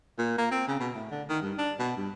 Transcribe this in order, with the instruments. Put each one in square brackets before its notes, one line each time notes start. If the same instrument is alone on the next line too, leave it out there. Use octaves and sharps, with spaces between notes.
[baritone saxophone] A#2
A#3
C4
C#3
B2
A2
D3
D#3
G2
D4
B2
G2